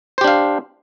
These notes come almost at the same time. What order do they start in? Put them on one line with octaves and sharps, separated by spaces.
C5 G4 D4 F5